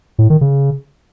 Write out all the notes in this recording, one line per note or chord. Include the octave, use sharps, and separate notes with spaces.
A2
D#3
C#3